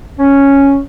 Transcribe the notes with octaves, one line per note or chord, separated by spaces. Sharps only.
C#4